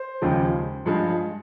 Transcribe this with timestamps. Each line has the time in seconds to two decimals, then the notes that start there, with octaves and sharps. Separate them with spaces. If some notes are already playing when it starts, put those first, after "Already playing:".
Already playing: C5
0.22 D#2 C#3 F3 G#3
0.86 G2 F3 G#3